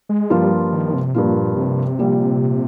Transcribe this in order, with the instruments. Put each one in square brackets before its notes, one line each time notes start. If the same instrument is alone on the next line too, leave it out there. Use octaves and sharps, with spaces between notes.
[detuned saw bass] G#3
[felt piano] G2 F3 A#3 F4 [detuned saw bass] G3
[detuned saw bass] D#3
C3
[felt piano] G2 F3 A#3 F4 [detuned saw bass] A#2
[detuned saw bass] C3
[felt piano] A#1 A#2 G3